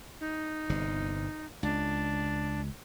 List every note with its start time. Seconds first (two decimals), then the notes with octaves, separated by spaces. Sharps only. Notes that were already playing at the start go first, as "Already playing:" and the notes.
0.20 D#4
0.70 G1 C3
1.63 C#2 D4